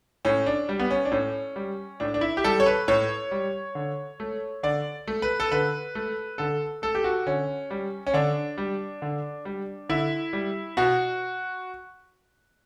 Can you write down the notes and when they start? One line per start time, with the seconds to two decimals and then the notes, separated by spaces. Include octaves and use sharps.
0.25 A2 C#4
0.46 D4
0.69 G3
0.79 B3
0.90 C#4
1.05 D4
1.12 A2 C#4
1.56 G3
2.00 A2 D4
2.14 D4
2.21 E4
2.37 G4
2.44 G3 A4
2.60 C#5
2.66 B4
2.88 A2 C#5
3.31 G3
3.75 D3
4.20 A3
4.63 D3 D5
5.07 A3
5.22 B4
5.40 A4
5.51 D3 B4
5.95 A3
6.38 D3 A4
6.82 A3 A4
6.95 G4
7.04 F#4
7.27 D3 C#4
7.71 G3
8.07 C#4
8.14 D3 D4
8.58 G3
9.02 D3
9.45 G3
9.89 D3 E4
10.33 G3
10.77 B2 F#4